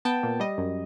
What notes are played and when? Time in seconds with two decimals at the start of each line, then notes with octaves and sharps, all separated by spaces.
0.05 B3 G5 A5
0.23 A#2
0.40 G3 D#5
0.58 F#2